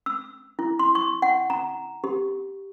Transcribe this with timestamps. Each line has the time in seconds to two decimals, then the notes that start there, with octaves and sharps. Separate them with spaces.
0.06 E6
0.59 E4
0.79 C6
0.95 C#6
1.22 F#5
1.50 A#5
2.04 G4